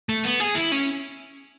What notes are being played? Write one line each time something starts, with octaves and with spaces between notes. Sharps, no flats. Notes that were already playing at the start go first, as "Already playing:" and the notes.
A3
B3
G#4
E4
C#4